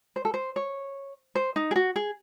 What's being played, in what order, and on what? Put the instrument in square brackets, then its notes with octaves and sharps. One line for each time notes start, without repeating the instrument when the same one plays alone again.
[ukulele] C5
A4
C5
C#5
C5
D#4
G#4
F#4
G#4